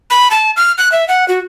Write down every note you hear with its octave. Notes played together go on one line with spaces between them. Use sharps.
B5
A5
F6
F#6
E5
F#5
F#4